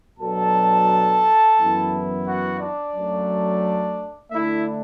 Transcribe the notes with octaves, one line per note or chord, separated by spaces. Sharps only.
B2 F#3 D4 A4 A5
F#2 E3 B3 E4
F#4 F#5
D4 D5
F#2 F#3 A3
D3 A3 D4 E4 E5